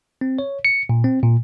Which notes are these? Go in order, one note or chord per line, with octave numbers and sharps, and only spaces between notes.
C4
C#5
C#7
A#2
C4
A#2